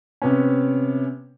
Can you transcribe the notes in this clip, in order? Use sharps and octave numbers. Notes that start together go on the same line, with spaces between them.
C3 B3 C#4